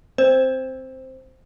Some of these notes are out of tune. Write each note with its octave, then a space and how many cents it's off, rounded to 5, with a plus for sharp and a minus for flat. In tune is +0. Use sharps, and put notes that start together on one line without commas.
C4 +0 C5 +0